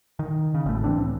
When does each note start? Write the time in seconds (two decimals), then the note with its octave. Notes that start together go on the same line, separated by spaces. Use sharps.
0.19 D#3
0.54 C#3
0.66 G#1 A2 A3
0.84 E3 C4 D4
0.97 C2 A2 E3